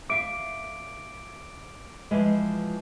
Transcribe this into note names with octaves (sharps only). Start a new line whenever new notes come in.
E5 F5 D6 D7
E3 F3 G#3